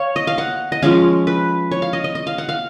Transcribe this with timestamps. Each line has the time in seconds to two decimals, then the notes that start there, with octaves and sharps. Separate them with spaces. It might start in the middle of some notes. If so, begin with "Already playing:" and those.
Already playing: C#5 F5
0.16 D#5
0.27 F5
0.38 F#5
0.72 D#5
0.82 F3 G#3 C#4 F5
1.27 B4
1.71 C#5
1.82 F5
1.93 D#5
2.04 D#5
2.15 D#5
2.27 F5
2.38 F#5
2.49 F5